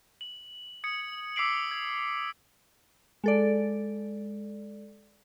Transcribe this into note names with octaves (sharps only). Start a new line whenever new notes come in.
F#7
D#6 G#6 C#7
D6 E6 B6 C7 D7 F#7
G#6
G#3 A4 D5